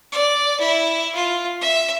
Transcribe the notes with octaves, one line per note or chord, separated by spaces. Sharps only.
D5
E4
F4
E5